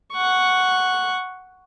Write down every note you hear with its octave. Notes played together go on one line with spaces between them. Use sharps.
F#5 C#6